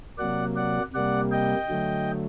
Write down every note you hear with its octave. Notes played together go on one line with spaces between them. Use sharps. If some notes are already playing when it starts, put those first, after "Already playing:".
C3 F#3 A#3 D5 F#5
D5 F#5
C3 G3 A#3 D5 F#5
D#5 G5
D3 F#3 A3